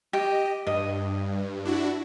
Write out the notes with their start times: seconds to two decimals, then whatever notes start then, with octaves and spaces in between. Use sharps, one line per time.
0.13 G4 D#5
0.67 G2 D#5
1.65 D4 E4 F#4